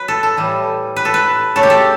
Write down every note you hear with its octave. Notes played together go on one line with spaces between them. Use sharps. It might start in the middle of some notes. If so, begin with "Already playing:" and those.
Already playing: F#3 B4
A4
A4
A2 E3 G3
B4
A4
B4
C#3 F#3 A3 A4
G4
A4